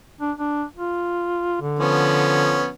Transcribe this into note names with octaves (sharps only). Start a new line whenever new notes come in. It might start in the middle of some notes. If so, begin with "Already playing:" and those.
D4
D4
F4
D3
F3 B3 C#4